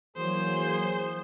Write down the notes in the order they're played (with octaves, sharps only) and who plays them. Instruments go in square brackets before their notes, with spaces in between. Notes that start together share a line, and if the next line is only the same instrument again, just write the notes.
[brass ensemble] E3 A#3 G#4 [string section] F#3 [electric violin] C5